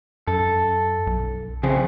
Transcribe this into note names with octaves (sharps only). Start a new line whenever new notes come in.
F#2 A4
B1
F2 C#3 C4 G#4